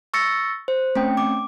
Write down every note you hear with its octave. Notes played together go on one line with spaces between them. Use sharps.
C#6 E6 A6 A#6 C#7
C5
A3 C4 C#4 G5
D6